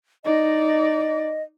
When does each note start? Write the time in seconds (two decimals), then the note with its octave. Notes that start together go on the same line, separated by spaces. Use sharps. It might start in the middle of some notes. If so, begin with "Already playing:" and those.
0.25 D#4 D5 D#5